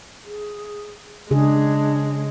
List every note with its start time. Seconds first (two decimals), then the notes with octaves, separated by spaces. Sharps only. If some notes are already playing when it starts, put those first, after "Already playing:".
0.25 G#4
1.31 C#3 G#3 D4 G#4